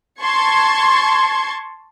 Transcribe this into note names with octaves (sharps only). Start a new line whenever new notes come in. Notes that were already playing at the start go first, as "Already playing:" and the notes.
A5 C6 C#6 G#6